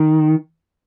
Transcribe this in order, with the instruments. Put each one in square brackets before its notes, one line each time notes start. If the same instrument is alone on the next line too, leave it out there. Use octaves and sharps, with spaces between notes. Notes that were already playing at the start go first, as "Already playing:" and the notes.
Already playing: [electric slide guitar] D#3